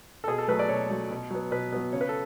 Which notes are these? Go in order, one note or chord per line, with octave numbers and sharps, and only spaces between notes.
A4
B2 G#4
A4
F#3 A3 B4
D5
B2 C#5
F#3 A3
B2
F#3 B3
B2 B4
F#3 B3
C#3 C#5
B4
A4